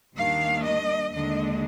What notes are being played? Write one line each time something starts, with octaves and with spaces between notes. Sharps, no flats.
D#2 D#3 G3 A#3 D4 F5
D#5
D#2 D3 G#3 D4 D#5